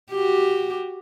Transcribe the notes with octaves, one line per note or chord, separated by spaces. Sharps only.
F#4 G4